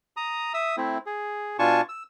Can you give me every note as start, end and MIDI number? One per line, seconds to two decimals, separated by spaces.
0.17 0.53 82
0.17 0.53 87
0.54 0.76 76
0.54 0.76 87
0.54 0.76 88
0.77 0.98 57
0.77 0.98 60
0.77 0.98 64
1.06 1.57 68
1.59 1.81 47
1.59 1.81 62
1.59 1.81 65
1.59 1.81 80
1.59 1.81 81
1.59 1.81 85
1.89 2.03 88